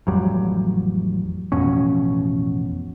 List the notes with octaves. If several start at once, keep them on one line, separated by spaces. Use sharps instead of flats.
A1 F2 F#3 G3
A1 F2 B2 C#4